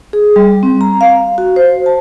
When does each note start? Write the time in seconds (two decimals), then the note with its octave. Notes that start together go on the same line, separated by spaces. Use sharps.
0.13 G#4
0.36 G3
0.63 C4
0.81 A#5
1.01 F5
1.38 F#4
1.56 C5
1.86 A5